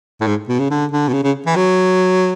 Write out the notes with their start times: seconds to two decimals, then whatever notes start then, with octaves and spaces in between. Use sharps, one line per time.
0.20 A2
0.27 G#2
0.49 B2
0.59 C#3
0.70 D3
0.91 D3
1.08 B2
1.13 C#3
1.23 C#3
1.46 E3
1.56 F#3